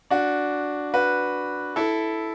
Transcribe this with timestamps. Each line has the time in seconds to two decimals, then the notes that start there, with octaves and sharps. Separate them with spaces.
0.10 D4 F#4
0.94 F#4 B4
1.76 E4 A4